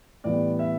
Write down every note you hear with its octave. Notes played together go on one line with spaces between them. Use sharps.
A2 E3 G3 B3 D5
E5